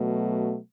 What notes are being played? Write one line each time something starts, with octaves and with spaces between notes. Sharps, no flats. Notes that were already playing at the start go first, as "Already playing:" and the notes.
Already playing: B2 F#3 A3